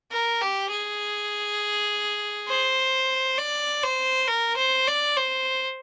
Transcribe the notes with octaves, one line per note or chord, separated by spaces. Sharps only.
A#4
G4
G#4
C5
D5
C5
A#4
C5
D5
C5